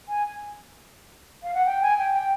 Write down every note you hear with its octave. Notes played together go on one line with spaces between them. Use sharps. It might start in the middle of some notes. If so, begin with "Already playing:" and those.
G#5
F5
F#5
G5
G#5
G5
G5